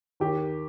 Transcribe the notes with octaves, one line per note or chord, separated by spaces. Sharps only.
D#2 G4